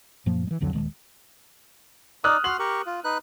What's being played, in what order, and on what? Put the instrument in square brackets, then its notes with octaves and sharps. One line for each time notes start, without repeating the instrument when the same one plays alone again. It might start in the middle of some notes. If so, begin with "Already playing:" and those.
[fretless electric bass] F#2 A#2 F3 A#3
E3 G#3
C2 F2 D3 F#3
D#1 D#3 G#3
[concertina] D#4 D5 [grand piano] D#6 F6 F#6
[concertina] F#4 C6 F6 [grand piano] F#7
[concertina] G4 A#4 C#6
F4
D#4 B4 F#6